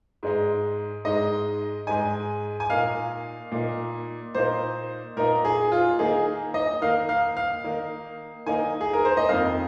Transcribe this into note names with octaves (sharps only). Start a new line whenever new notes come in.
G#2 G#3 D#4
G#2 G#3 D#4 D#5
G#2 G#3 D#4 G#5
G#5
A#2 A#3 D#4 F5
A#2 A#3 D#4
A#2 A#3 D#4 C5
A#2 A#3 D#4 A#4
G#4
F4
D#3 A#3 D#4 G#4
D#5
D#3 A#3 D#4 F5
F5
F5
D#3 A#3 D#4
D#3 A#3 D#4 G#5
G#4
A#4
C5
D#5
F2 D#3 A#3 F5